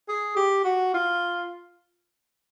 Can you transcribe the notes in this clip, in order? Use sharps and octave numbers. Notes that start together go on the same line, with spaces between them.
G#4
G4
F#4
F4